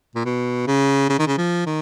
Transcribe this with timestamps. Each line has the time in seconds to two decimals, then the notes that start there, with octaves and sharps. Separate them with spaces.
0.15 A#2
0.25 B2
0.67 C#3
1.10 C#3
1.19 D#3
1.28 C#3
1.38 F3
1.66 D#3